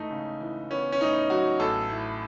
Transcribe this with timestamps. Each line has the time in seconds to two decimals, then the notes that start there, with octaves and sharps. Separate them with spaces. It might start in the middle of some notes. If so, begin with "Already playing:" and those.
Already playing: G#2 E3 A3 D#4
0.11 C#3
0.40 E3
0.71 B3 C#4
0.92 C#4
1.00 A2 D#4
1.30 F#3 F#4
1.60 A1 A4
1.90 A2